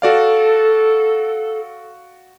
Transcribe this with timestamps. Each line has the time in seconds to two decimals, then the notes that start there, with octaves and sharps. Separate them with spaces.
0.02 F#4 A4 D5 F5